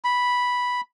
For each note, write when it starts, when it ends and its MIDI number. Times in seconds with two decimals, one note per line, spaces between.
0.04 0.81 83